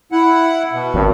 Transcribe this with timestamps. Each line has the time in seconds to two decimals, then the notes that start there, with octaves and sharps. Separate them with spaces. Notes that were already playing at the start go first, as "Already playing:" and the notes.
0.12 E4 F#5
0.72 B2
0.94 G#1